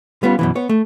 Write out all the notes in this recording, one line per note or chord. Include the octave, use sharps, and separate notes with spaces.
G3 B3 C#4 F4
F#2 B2 E3
B3 C#5
A3